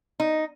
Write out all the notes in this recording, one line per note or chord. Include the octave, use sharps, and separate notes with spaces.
D#4